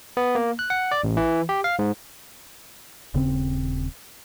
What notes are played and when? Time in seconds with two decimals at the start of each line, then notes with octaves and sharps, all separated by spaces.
0.17 B3
0.35 A#3
0.59 F#6
0.70 F#5
0.91 D5
1.04 A1
1.17 E3
1.49 G4
1.64 F5
1.79 G#2
3.14 D#1 C#3 C4